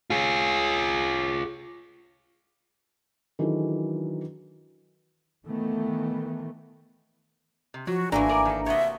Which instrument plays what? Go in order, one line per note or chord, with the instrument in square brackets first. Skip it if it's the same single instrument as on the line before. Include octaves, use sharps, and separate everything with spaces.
[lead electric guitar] F4 G#4
[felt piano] D#3 E3 F#3 D4 G#4 A4
[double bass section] D#3 E3 A3 B3
[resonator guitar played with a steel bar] C3
[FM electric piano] F3 [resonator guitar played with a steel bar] F#3 [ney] F#4
[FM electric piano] G#1 D4 A#5 [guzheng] E3 A3 A#3 [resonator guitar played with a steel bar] F#3 [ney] G#5
[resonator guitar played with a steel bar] A#4 D5
D#3 A4
[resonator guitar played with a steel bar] C3 F#4 [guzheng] C#5 D#5 [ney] E5